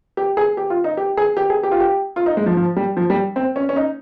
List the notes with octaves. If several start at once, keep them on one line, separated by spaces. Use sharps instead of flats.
G4
G#4
G4
F4
D#4
G4
G#4
G4
G#4
G4
F4
G4
F4
D#4
G#3
F3
F3
G3
F3
G3
C4
C#4
C#4
D#4